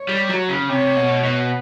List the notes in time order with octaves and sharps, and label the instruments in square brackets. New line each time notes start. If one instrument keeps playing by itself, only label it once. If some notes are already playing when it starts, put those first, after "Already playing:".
Already playing: [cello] C#5
[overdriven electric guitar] G3
F#3
C#3
[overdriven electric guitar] C3 [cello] C#5
[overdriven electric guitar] B2
B2